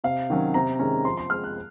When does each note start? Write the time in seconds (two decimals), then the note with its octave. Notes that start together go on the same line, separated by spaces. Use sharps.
0.04 C3 F5
0.30 D#3 F#3 C#4
0.54 C3 A#5
0.79 D#3 G#3 C#4
1.05 F3 C6
1.17 C6
1.30 G#3 C4 F6
1.44 F#6